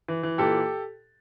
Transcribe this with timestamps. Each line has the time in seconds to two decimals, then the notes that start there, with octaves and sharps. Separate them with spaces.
0.08 E3
0.23 E3
0.38 A#2 G4 A4